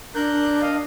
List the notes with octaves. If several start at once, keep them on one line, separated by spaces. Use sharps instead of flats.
D4 A#4 F#6 G6
D#5 F5